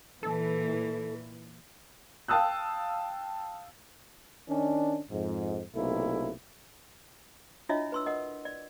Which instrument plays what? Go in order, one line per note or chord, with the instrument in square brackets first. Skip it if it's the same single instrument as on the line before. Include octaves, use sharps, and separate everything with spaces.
[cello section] A#2 E3 [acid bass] A4
[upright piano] F5 G5 A5 D#6 E6 F#6
[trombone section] D#3 C#4 D4
F2 G#2
B1 C3 A3 A#3 E4
[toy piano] D4 E4 F4 C#5 D#5 E5
B4 C6 E6
A#4 D#5 F#5
D5